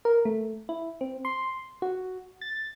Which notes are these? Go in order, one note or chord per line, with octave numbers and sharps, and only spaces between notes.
A#4
A3
E4
C4
C6
F#4
A6